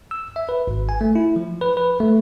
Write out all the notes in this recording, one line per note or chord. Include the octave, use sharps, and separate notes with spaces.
E6
E5
B4
G#1
G#5
A3
E4
F3
B4
B4
A3